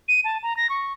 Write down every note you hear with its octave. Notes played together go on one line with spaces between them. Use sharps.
D#7
A5
A#5
A#6
C#6